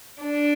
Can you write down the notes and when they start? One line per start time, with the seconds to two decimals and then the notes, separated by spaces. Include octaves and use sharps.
0.21 D4